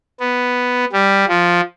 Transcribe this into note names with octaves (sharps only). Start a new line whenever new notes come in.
B3
G3
F3